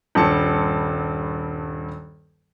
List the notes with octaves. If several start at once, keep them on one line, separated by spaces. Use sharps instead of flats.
D#1 G2 A5 C#7